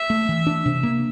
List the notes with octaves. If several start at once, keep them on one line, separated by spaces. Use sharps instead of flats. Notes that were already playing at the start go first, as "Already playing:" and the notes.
Already playing: E5
A3
E3
D4
C3
A#3